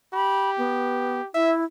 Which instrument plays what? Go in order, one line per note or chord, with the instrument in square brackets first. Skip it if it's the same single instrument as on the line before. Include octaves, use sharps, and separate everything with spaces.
[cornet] G4 [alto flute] B5
[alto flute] B3
[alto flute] E4 [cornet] E5